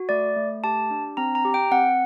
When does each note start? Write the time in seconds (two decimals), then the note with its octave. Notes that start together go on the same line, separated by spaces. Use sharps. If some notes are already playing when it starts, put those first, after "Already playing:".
Already playing: F#4
0.09 A3 D5
0.37 A3
0.64 G4 A5
0.91 D4
1.17 C4 A#5
1.35 A#5
1.45 G4
1.54 G5
1.71 C4 F#5